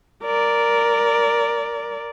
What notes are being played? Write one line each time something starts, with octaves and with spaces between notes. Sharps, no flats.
A#4 D5